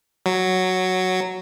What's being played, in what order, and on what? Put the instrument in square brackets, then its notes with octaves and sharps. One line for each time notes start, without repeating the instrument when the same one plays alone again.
[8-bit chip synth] F#3